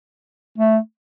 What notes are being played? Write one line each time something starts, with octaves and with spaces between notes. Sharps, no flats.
A3